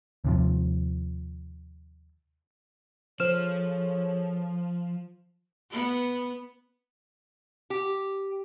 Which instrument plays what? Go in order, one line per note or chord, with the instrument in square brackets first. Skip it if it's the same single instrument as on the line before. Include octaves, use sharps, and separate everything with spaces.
[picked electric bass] D#2 C3 F3
[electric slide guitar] F3 [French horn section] G#4 A4 C#5 [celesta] C5 F6 E7
[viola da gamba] B3
[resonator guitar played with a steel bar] G4